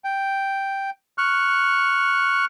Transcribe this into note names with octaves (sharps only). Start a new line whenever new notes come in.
G5
C#6 F6 F#6